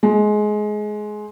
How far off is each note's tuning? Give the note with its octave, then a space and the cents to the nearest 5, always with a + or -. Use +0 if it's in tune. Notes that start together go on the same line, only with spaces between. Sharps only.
G#3 +20